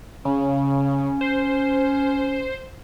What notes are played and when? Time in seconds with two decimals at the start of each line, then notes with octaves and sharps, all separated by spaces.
0.25 C#3 C#4
1.21 C5